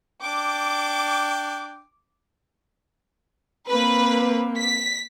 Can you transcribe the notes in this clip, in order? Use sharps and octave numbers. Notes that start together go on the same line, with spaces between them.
D4 G5 D6
A#3 C4 B4
B6